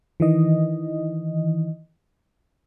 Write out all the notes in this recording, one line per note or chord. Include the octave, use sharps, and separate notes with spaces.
D#3 E3 D#5